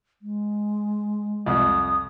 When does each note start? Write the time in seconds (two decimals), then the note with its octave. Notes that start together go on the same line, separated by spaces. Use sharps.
0.22 G#3
1.46 C2 F2 D#6